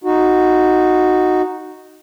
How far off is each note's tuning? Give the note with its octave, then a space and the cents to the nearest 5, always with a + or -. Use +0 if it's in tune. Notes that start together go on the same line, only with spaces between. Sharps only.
D#4 +0 F#4 -5